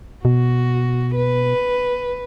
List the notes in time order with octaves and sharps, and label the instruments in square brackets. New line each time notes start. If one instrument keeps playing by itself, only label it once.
[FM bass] B2 [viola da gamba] F#4
[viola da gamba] B4